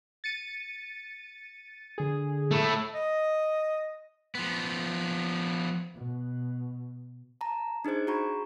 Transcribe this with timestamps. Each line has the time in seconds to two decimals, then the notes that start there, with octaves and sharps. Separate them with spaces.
0.24 A6 C#7 D#7
1.98 D3 G#4
2.51 A3 E4
2.94 D#5
4.35 F3 B3
5.94 B2
7.41 A5 A#5
7.85 D4 D#4 G#4 C5 G#6
8.07 F#4 G#4 A#5 B5 C#6